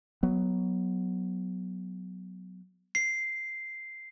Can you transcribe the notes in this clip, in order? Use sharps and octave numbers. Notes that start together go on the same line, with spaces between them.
F#3 B3
C7